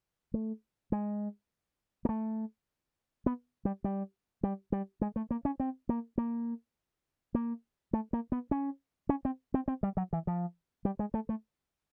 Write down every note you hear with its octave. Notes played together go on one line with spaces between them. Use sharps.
A3
G#3
A#3
A3
B3
G3
G3
G3
G3
G#3
A3
A#3
C#4
C4
A#3
A#3
A#3
A3
A#3
B3
C#4
C#4
C4
C4
C4
G3
F#3
E3
F3
G3
G#3
A3
A3